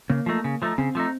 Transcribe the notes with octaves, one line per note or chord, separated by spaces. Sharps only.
C#3 A#3
F3 A3 D#4
C#3
F3 A3 D#4
C#3 C4
F3 A3 D#4